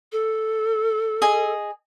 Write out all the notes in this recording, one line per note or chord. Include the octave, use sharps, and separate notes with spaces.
A4
G#4 D#5 G#5